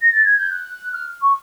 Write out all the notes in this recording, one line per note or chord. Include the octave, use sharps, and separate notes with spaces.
A#6
A6
G#6
G6
F#6
F6
C#6